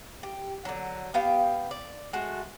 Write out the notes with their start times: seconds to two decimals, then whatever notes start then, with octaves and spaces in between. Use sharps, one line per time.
0.23 G4
0.65 D3 F#3
1.14 B3 G4 F5 G5
1.71 D5
2.13 G#3 A3 F#4